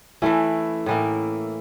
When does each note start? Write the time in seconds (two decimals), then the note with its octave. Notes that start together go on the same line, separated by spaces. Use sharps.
0.22 E3 A3 C#4 E4
0.86 A2 E3 A#3